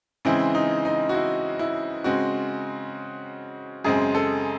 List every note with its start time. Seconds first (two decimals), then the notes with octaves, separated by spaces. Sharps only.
0.25 C#3 E3 G#3 C4 E4
0.55 D#4
0.85 D#4
1.09 F#4
1.14 E4
1.59 E4
2.04 C#3 G#3 C4 F#4
3.84 F#2 C#3 G#3 C4 G#4
4.15 A4